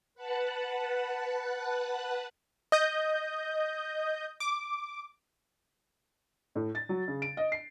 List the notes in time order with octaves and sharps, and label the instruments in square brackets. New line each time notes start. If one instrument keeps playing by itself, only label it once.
[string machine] B4 F#5 A5 F#6
[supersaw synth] D#5 G6
D6
[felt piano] A2
A6
F#3
C#3
D7
D#5
C7